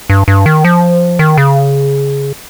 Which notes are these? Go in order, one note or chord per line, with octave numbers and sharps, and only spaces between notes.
G2
G2
D#3
F3
D#3
C#3